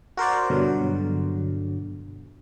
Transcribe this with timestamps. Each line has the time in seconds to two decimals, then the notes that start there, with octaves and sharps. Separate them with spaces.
0.17 F#4 A#4 C5 D5
0.50 G2 B2 D3 F#3